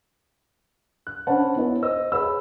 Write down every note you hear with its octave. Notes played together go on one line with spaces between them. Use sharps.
F#6
C#4 D4 C5 F#5 A5 B5
B3 E4 C#5
C5 D#5 E6
G#4 B4 C#5 B5 E6